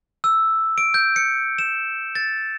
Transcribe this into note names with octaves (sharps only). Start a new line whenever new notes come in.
E6
D7
G6
C#7
E7
A6